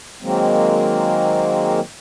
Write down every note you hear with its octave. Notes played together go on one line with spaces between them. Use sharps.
D#3 F#3 G#3 A#3 C4